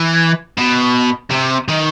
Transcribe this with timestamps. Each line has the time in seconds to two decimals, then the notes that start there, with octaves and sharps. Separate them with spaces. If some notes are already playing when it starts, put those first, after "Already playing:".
Already playing: E3
0.57 B2
1.31 C3
1.69 D#3